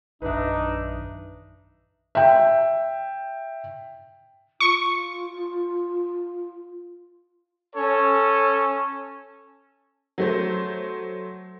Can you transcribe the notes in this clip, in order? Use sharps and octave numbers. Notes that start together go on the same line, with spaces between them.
A#1 F#2 D#3 D4 D#4 B4 E5
E5 G5
F4 C#6
C#4 A4 C#5
F#3 A3 C5